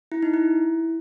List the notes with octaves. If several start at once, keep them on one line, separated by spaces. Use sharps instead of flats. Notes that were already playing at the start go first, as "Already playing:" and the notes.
E4
D#4
E4